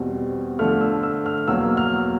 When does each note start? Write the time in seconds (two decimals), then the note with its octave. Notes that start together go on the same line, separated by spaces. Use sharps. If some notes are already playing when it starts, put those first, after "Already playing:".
Already playing: E2 B2 G3 C4
0.59 D3 F3 A3 F6
0.81 E6
1.03 E6
1.26 F6
1.48 E2 B2 F#3 A#3 E6
1.77 F6